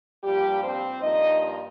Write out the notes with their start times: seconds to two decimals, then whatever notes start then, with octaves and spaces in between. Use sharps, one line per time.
0.24 G2 F3 G3 A#3 G4
0.63 C4 C5
1.01 G2 F3 A#3 D#4 D#5